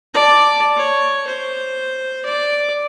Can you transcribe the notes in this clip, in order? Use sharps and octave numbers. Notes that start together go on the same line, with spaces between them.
D5 A5
C#5
C5
D5